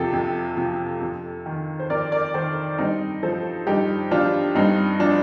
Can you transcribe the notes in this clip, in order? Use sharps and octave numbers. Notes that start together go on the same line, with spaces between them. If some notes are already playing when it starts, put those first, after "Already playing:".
Already playing: F2 C3 F3 G4 A4
F2
C3 F3
F2
D#3
C5
F2 A#4 D5
A#4 D5
D#3 A4 C5
G2 C4 D#4
F3 A4 C5
G2 D#4 G4
F3 D4 F4
G2 C4 D#4
F3 D4